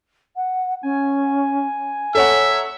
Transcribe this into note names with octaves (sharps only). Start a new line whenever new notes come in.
F#5
C#4 G#5
A4 C#5 E5 F#5 A#5